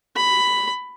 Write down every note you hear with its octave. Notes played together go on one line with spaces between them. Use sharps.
B5